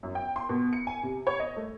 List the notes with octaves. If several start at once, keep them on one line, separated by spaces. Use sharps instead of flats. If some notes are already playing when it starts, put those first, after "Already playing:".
F#2
G5
C6
B2
C#7
G#5
C3
C#5
D#5
A3